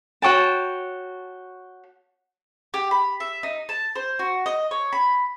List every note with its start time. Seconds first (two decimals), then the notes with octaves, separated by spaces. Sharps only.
0.22 F#4 C#5 G5 A5
2.74 G4
2.91 B5
3.20 E5
3.43 D#4
3.69 A5
3.96 C5
4.19 F#4
4.46 D#5
4.71 C#5
4.93 B5